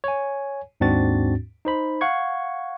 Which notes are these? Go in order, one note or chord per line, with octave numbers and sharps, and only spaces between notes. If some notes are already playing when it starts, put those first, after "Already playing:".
C#5 G#5
D#2 G#2 C4 D4 F#4 A6
D#4 C5 B5
F5 F#5 C#6 G#6